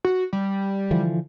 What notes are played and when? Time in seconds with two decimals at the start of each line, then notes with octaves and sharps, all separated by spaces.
0.05 F#4
0.33 G3
0.91 D3 E3 F3